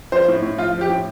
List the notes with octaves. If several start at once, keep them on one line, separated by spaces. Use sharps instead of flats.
F3 C5
A2
A2
F3 F4
F3
G4
A2